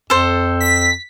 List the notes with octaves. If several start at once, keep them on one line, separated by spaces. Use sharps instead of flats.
F2 A4 C5
B6